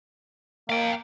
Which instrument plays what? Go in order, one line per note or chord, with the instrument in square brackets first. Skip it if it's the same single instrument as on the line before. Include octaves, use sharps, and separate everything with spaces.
[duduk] A#3 [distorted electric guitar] F5 G5